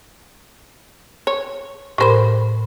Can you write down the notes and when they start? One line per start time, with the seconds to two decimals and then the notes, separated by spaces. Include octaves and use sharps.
1.27 C#5
1.98 A2 G3 A#4 C5 B5